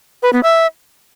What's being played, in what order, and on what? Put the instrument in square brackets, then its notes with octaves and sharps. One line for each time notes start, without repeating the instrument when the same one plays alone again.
[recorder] B4
B3
E5